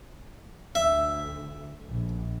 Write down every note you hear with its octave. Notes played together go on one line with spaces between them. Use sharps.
D2 E5
A#1